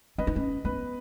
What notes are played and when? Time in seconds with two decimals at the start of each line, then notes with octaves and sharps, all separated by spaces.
0.18 C#4 B4 D#5
0.27 D#4
0.36 C#4
0.65 B3 B4